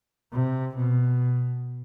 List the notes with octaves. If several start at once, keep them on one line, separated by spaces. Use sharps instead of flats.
C3
B2